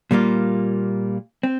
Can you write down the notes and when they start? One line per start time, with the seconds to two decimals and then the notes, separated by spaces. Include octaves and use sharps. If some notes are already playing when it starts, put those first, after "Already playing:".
0.11 A#2 G3 A#3 F4
1.43 C4